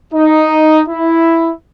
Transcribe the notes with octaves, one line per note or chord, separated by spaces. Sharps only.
D#4
E4